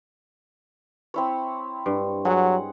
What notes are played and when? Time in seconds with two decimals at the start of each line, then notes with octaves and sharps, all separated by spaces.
1.14 C4 E4 C#5
1.86 G2
2.25 F#3 G#4 F#5